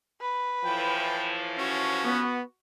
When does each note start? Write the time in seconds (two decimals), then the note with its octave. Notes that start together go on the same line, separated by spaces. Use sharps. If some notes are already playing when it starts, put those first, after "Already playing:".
0.21 B4
0.65 A2 E3 F3 G5
1.58 C#4 F#4
2.04 B3